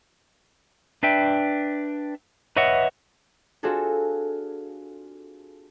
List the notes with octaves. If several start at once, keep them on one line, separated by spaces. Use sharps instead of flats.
D4 B4 E5 G5
B4 C#5 D#5 E5 F#5
C4 D4 F4 F#4 G#4 A4